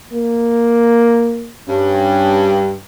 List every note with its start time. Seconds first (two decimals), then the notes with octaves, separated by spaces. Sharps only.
0.12 A#3
1.68 G2 C#4